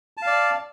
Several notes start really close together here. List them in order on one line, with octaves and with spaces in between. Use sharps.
A5 F5 D5